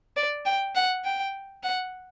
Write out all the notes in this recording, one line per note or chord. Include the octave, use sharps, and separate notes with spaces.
D5
G5
F#5
G5
F#5